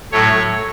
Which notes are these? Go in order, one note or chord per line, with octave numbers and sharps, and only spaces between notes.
A2 F#3 A3 C#5